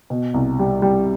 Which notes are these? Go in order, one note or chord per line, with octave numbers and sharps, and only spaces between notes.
B2
C2
G3
G3